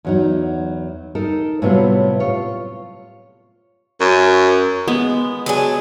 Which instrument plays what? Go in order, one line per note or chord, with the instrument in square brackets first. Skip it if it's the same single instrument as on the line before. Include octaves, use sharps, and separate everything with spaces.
[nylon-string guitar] E2 F#3 D#4
D#4 A4 A#4
A2 C3 F#3 G3 B3 F4
F4 C#5
[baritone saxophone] F#2
[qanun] G#3 B3
[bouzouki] F#3 D4 G#4